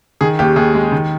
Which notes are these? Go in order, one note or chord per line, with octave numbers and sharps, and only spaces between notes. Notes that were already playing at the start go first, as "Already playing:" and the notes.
D#3 G#4
D#2 G4
D#2 G#4
G#3
D#3